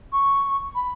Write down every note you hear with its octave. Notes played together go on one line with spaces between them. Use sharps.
C#6
B5